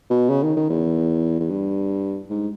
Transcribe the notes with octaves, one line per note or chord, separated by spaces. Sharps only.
B2
C#3
D#3
D#3
E2
E2
G2
G#2